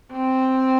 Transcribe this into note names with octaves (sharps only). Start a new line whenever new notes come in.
C4